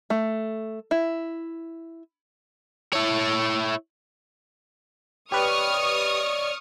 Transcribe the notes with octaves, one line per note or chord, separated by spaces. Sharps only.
A3
E4
E4 C#5
G4 B4 C#5 D5 C#6 D#6 F6